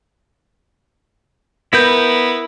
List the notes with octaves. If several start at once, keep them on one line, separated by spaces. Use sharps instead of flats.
B3 E4 A#4 G6